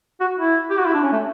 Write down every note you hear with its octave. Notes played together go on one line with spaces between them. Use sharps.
F#4
E4
G4
F#4
E4
D4
C#4
A3